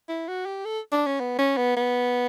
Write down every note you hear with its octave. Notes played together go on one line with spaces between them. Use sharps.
E4
F#4
G4
A4
D4
C#4
B3
C#4
B3
B3